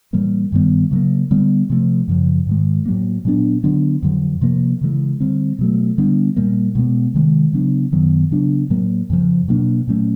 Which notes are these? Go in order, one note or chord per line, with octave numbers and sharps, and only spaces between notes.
A2 E3 G3 A#3
G2 D#3 G3 B3
C#3 F#3 A#3
D3 G3 B3
C3 F3 A3
F#2 C#3 F3
G#2 D#3 G#3
A2 F#3 A#3
A#2 F#3 B3 D4
D3 F#3 B3 D4
F2 D3 F#3
C3 F3 A#3
C#3 E3 G#3
D3 G3 C4
B2 F#3 A3
D3 G3 B3 D4
A#2 G3 A#3
B2 G#3 B3
C3 D#3 G#3
C#3 F#3 B3 D4
F#2 D#3 F#3 B3
C#3 F#3 B3 D4
A2 F#3 A#3
F2 C#3 F3
B2 F#3 A#3 D4
A#2 F#3 A3 C#4